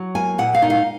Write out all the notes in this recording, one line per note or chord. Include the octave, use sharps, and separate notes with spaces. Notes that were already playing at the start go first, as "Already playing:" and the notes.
Already playing: F#3
A#3 G#5
A#2 F#5
F5
D#4
F5